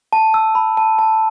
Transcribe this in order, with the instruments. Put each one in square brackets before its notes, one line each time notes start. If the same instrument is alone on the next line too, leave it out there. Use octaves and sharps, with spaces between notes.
[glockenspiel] A5
E6
B5
A5
A5